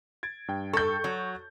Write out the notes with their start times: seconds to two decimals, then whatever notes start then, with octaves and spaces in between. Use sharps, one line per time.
0.23 G#6 A6 D7
0.48 G2 G5
0.73 A4 C#6 G6
1.04 F#3 F#4